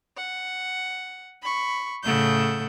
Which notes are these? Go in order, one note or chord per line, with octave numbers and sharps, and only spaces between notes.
F#5
B5 C#6
A2 C#3 A3 A4 F#5 G6